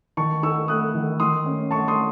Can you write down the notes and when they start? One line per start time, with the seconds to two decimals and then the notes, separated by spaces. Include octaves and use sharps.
0.17 D#3 A5 C#6
0.43 D#4 C#6 E6
0.68 A3 D#6 F#6
0.95 D#3
1.20 D#3 C6 D#6
1.46 C#4
1.71 A3 A5 C#6
1.88 C6 D#6